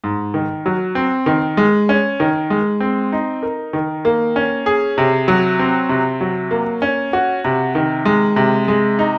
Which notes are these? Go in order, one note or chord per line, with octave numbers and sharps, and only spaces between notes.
G#2
D#3
F#3
C4
D#3
G#3
C#4
D#3
G#3
C4
D#4
A#4
D#3
A#3
C#4
G#4
C3
F#3
C4
C3
F#3
A#3
C#4
F#4
C3
D#3
G#3
C3
G#3
D#4